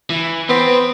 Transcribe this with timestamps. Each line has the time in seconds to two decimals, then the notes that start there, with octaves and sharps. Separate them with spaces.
0.10 E3
0.49 B3 C4 C5